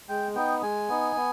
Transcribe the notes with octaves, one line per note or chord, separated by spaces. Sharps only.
G#3 G5
B3 D#4 G5
G#3 G#5
B3 D#4
B3